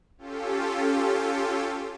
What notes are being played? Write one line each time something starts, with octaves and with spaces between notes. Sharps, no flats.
C#4 F4 G4 A4